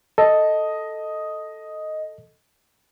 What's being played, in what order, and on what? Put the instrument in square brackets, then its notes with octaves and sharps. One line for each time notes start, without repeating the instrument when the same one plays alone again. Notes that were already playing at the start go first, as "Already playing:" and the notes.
[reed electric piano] A4 [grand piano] D#5